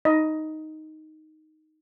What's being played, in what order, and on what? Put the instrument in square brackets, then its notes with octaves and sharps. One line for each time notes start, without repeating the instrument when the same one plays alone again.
[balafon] D#4 [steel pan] D#5